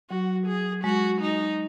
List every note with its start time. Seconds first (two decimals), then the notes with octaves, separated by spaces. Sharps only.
0.10 F#3 F#4
0.47 G#4
0.84 G#3 F#4
1.21 D#4